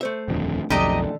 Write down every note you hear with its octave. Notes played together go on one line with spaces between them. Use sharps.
A3 C5 E5
D#1 F2 D3
B1 F2 D3 D#3 A3 G4 D#5 A#5